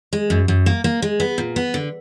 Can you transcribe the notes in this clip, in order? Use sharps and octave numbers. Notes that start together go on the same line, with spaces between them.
G#3
F#2
F#2
A#3
A#3
G#3
B3
A#2
B3
D3